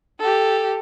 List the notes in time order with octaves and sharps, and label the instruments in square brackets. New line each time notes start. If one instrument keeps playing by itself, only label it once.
[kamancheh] G4 A4